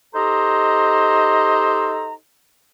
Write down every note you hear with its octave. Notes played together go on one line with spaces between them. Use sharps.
D#4 G4 A4 C5 D#5 A#5